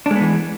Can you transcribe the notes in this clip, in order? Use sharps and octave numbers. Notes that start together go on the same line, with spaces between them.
E3 G#3 B3 D4